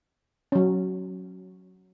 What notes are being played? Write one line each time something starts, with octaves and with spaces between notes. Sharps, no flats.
F#3 C#4